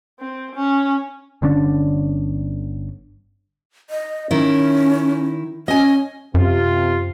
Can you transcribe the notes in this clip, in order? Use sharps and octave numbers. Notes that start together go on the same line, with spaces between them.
C4
C#4
G1 D3 C#4 D4
D#5
D#3 C#4 E4
C#4 D#5 G#5
F#2 C3 F4